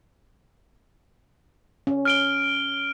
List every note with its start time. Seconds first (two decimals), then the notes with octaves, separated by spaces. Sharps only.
1.87 C#4
2.05 F6 D7 G7